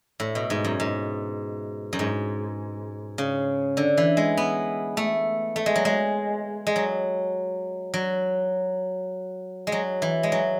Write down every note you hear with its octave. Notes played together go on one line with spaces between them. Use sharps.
A2
B2
G#2
F#2
G#2
F#2
G#2
C#3
D3
E3
G#3
B3
A3
A3
G#3
F#3
G#3
G#3
F#3
F#3
G#3
F#3
E3
G#3
F#3